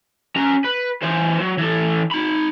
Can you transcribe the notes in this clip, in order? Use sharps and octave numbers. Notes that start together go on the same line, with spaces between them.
C#4 A#5
B4
E3 C5
F#3
E3 A4
D#4 B5